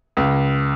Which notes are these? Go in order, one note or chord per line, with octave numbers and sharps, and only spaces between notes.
C#2